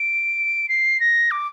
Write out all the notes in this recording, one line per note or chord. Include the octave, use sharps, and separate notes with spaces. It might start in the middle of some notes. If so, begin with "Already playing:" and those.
Already playing: D7
C7
A#6
D6